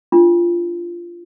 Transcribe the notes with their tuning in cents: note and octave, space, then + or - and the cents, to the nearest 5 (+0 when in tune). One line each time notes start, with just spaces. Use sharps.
D4 +0 F4 -15